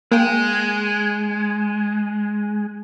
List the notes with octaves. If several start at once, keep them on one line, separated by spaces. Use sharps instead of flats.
G#3 A#3 G5